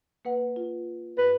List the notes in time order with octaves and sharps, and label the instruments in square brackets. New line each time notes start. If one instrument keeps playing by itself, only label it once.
[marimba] A#3 B4 F#5
F4
[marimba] G2 [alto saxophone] B4